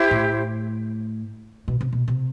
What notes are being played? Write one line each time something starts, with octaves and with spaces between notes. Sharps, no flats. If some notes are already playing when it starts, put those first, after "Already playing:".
Already playing: E4 G4 C5
A2
B2
C3
B2
C3